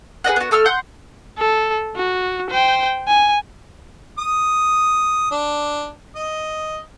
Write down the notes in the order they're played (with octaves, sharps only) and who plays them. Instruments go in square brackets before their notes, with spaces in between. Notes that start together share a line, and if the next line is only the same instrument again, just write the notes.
[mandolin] G#4 B4 D#5 F#5
B3 F#4
A3 A4 E6 F6
F#5 C6 G6
[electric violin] A4
F#4
C5 G5
G#5
[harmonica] D#6
D4
D#5